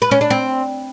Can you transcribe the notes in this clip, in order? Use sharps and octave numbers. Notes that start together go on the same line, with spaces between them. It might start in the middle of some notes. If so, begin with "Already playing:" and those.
B4
C#4
D4
C4